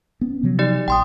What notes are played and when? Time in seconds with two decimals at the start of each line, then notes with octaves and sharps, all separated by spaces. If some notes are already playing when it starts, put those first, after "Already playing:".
0.21 B3 C#4
0.43 C3 F3 F#3
0.59 D#4 G4 D5
0.88 A#1 G5 C6 D#6